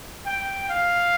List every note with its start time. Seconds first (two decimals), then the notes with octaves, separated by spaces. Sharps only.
0.26 G5
0.69 F5